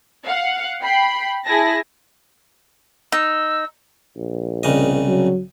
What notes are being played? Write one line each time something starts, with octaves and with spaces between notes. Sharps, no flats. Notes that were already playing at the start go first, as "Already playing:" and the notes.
F5 F#5
G5 B5 C7
E4 G#4 G#5 A5 A#6
D#4 E6
A#1
C2 C#3 D#5
F#3